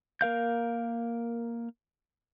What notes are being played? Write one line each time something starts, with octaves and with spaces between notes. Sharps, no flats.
A#3 A#4 F5 G6